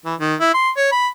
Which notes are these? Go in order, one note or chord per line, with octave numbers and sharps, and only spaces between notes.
E3
D#3
E4
C6
C#5
B5